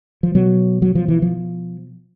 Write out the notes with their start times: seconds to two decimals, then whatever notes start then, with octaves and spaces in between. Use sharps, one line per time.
0.23 F3
0.35 B2 F#3
0.82 F#3
0.95 F3
1.08 E3
1.22 F3